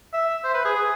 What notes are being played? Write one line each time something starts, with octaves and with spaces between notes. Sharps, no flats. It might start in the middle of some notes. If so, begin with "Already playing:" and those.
E5
C5
B4
G#4
G#4